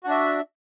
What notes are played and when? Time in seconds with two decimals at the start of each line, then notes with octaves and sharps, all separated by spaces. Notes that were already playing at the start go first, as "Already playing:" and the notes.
0.04 F#4
0.07 D4
0.11 E5